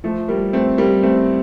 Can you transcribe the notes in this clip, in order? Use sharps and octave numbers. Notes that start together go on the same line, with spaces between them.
F3 A3
G3 A#3
A3 C4
G3 A#3
A3 C4